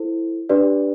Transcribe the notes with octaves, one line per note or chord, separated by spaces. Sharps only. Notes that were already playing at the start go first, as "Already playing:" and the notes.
Already playing: E4 A4 C5
D4 G4 B4 D5